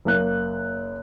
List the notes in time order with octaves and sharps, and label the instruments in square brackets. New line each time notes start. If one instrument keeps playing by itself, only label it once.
[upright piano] F#1 A#3 F#6